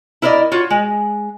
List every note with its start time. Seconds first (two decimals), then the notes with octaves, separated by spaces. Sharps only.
0.22 E4 A#4 B4 D5 D#5
0.52 F4 F#4 C#5
0.70 G#3